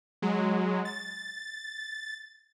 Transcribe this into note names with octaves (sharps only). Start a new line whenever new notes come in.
F#3 G#3
A6